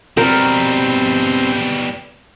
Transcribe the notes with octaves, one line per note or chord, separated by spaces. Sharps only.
B2 G3 C4 A#4 G5